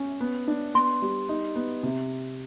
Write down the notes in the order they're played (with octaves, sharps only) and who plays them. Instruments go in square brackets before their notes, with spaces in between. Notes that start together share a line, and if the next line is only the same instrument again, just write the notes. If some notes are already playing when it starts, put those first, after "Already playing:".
Already playing: [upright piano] C#4
B3
D4
[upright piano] B3 [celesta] C6
[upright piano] G3
D#4
B3
C3